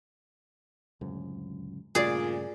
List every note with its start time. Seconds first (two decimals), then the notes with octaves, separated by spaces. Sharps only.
1.01 D1 C#2 F#2
1.95 G2 A#2 C#3 A3 G#4 D5